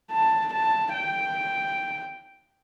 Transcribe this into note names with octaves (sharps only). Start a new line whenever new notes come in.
A5
A5
G5